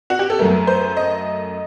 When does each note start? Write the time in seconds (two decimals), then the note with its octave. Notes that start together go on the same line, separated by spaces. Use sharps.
0.10 F#4
0.19 G4
0.30 A4
0.39 F#2 F#3 A3 A#4
0.67 C5
0.97 D#5